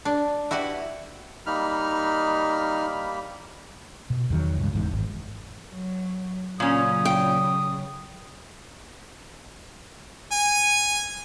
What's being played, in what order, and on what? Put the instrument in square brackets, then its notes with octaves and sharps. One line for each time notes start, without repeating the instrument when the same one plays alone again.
[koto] D4
E4 F#4 G4 B4
[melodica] G3 A#3 B5 [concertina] D#4 F6
[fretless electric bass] B2
E2 D#3 F#3
C#2 G2
F1 E2 G#2
G#1
[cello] F#3
[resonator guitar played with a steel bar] A#2 C#4 [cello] C#3 F#3 [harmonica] D#6
[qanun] G5
[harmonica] G#5